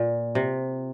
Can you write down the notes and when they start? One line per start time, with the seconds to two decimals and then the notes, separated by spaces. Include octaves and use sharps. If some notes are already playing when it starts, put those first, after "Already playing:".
Already playing: A#2
0.35 C3